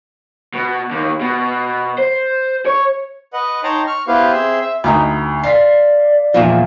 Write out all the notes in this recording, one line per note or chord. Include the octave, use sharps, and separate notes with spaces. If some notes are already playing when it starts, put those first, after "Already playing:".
B2
D#2
B2
C5
C#5
B4 D#5 F#5
D#4 C#5 G5 A5 A#5 C6
C#6 F6
B3 E4 G4 B4 C5 F5
C4 G#4 E5 C6
E5
D2 B3 D#4 G4
F4 D5 B6 C7
E2 A#2 F3